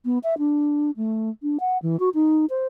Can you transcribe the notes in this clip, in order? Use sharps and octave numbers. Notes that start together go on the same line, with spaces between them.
B3
E5
D4
A3
D4
F#5
E3
F#4
D#4
C5